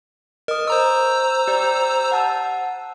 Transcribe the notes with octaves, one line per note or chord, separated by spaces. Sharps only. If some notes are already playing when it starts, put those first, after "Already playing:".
A#4 D#5 D#6
C5 A#5 C#6 E6
G4 D5 G6
F#5 A5 E6